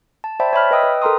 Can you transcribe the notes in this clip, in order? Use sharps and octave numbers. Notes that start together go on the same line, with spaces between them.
A5
C5 D5 E5 G5 A5 B5
C#5 E5 B5 F6
B4 D#5 G5 D#6 E6
B4
A4 A#4 G5 A#5 C6 D#6